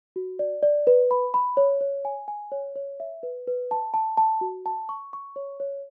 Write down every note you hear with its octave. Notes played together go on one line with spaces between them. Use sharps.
F#4
D5
D5
B4
B5
B5
C#5
C#5
G#5
G#5
C#5
C#5
E5
B4
B4
A5
A5
A5
F#4
A5
C#6
C#6
C#5
C#5